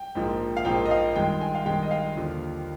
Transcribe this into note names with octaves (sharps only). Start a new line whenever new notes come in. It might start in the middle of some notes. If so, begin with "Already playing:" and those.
Already playing: G5
A#1 G#2 F3 A#3
F5
A#1 G#2 F3 A#3 G5
D#5
F5
G2 D#3 G#3 G5
G#5
F5
G2 D#3 G#3 G5
D#5
F5
D#2 D3 F3